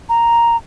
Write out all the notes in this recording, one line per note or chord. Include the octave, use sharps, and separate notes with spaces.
A#5